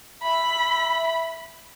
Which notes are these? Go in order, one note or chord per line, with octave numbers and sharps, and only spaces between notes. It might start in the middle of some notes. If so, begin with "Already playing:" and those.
E5 B5